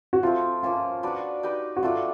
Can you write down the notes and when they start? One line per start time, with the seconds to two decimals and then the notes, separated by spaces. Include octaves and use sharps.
0.13 F#4
0.23 F3 A3 C4 F4
0.63 F3 A#3 C#4 F4
1.03 D4 F#4 B4 D5
1.43 D#4 G4 B4
1.76 F#4
1.83 F#3 A3 D4 F4